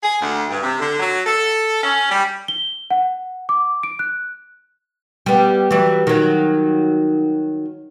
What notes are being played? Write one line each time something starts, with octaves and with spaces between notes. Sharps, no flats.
G#4
D2
G2
C3
D3
F#3
A4
C#4
G3
G7
F#5
D6
D7
F#6
G3 B3
E3 F#3 G3
D#3 F#3